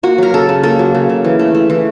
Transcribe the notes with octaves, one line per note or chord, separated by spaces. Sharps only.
A#3 F#4
F#3 A#4
C#3 A4
C#3
A#3 A4
F#3
C#3
C#3
E3
A3
A3
E3